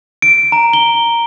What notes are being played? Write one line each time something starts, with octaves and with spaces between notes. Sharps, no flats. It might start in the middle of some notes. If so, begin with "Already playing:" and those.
D7
A#5
G7